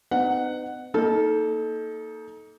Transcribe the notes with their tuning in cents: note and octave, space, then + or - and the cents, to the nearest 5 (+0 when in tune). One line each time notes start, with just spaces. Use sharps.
B3 +45 D#4 -30 F#5 +0
A#3 +0 D#4 +20 A4 -15